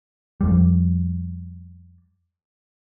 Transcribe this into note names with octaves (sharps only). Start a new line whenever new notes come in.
F2 G3